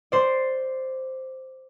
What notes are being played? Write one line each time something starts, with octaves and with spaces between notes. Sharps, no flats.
C5 D5